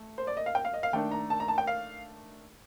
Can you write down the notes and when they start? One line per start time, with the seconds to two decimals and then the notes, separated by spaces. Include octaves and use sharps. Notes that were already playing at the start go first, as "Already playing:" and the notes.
Already playing: A3
0.18 C5
0.27 D5
0.37 D#5
0.46 F5
0.55 G5
0.65 F5
0.74 D#5
0.83 F5
0.93 D#3 A3 D4 G5
1.11 A#5
1.30 A5
1.40 A#5
1.48 A5
1.58 G5
1.67 F5